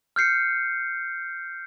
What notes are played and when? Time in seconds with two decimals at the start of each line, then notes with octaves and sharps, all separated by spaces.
0.16 F6 G6 C7 C#7